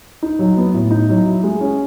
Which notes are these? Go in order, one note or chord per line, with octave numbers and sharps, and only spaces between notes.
D#4
F#3
B3
A2
D#4
F#3
E4
G#3
C#4